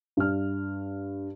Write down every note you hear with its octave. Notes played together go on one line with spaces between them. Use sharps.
G2 F6